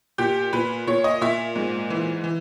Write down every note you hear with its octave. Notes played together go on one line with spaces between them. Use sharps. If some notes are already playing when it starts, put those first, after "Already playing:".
A#2 G4
A#2 B4
A#2 C#5
D#5
A#2 E5
G#2
E3
E3